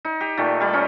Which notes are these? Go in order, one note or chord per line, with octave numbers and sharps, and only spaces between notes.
D#4
G4
A#2 D#3 A3
G3 G4 D5
C#4 D#4 C5